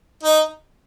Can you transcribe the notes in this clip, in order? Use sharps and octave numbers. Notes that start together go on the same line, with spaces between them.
D#4